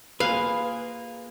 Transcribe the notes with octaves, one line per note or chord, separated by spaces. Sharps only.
A#3 F4 G#4 B4 F5